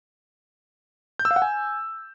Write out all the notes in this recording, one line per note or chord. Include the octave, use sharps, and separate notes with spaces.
G6
E6
F5
F#5
G#5